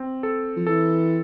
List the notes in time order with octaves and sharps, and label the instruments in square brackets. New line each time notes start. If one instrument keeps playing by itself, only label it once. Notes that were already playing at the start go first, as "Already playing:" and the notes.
Already playing: [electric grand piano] C4
A4
[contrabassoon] F3
[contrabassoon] E3 [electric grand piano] A4